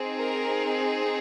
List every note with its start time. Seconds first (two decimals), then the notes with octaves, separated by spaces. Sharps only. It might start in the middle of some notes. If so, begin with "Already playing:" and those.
Already playing: C4 D#4 G#4
0.19 A#4